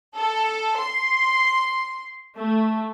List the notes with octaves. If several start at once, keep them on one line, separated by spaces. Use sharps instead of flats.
A4
C6
A3